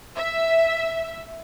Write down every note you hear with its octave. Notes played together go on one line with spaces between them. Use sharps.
E5